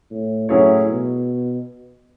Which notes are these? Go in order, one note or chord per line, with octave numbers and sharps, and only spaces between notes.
A2
A2 F#3 C#4 E4 G#4 C#5
B2